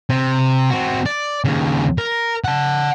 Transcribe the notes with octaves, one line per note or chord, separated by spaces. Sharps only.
C3
C4 F#4
D5
D#2 C#3
A#4
F#5 A5